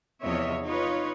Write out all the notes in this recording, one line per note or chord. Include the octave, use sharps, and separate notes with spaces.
E2 C3 F3 C#5 D#5 E5
D#4 F4 B4 C#5